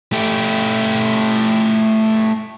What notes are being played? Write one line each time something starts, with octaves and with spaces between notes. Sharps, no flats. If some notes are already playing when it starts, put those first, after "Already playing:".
A3 G4